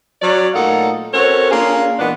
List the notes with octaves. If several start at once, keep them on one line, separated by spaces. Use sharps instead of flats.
F#3 C#4 D5
A#2 A3 D#4 A4 F5 F#5
C4 C#4 F#4 A4 A#4 C#5
A#3 C#4 D4 F4 G#4
A#2 E3 G#3 B3 D4